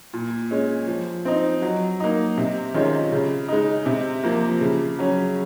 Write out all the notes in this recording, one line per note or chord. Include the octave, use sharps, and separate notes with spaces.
A#2
G#3 C#4
F3
C4 D#4
F#3
A#3 D#4
C3
D#3 G#3 C#4 F4
C#3
G#3 D#4
C3
F3 A#3
C#3
F#3 C#4